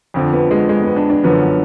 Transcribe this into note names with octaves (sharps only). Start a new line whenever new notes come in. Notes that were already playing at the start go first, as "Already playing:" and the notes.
F2 D3 F3
B3
G#3
G#3
B3
D4
D4
F#2 D3 F3 B3